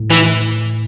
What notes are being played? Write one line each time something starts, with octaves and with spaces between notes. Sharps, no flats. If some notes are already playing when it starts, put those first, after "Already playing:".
Already playing: A2
E3